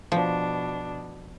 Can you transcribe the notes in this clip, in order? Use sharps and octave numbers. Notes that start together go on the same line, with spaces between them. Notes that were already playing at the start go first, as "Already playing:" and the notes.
B2 F3 D4